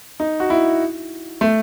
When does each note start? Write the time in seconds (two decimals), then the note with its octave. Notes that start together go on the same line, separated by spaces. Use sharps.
0.20 D#4
0.40 F#4
0.50 E4
1.41 A3